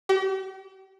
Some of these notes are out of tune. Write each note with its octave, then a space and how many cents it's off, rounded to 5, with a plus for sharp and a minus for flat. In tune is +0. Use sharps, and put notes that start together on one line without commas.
G4 -40